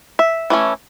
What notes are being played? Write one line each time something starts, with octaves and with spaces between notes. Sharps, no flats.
E5
E3 A3 C#4